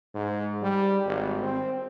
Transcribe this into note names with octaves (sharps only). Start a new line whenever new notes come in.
G#2
G3
G#1
C4